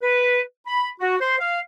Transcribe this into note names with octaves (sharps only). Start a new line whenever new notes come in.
B4
B5
F#4
C5
F5